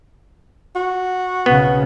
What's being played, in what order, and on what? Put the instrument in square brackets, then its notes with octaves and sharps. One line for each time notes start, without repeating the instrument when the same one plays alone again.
[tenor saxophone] F#4
[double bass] B1 C#3 [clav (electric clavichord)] B3